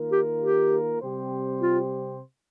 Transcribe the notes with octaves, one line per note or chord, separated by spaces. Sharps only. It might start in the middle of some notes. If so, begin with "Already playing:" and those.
Already playing: D#3 A#3 F4 A#4
G4
G4
C3 G3 C4 G4 C5
F4